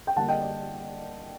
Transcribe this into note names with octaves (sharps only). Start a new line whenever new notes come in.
G5
D3 G3 A#3 D4 F#5 A5
D#5 G5
D5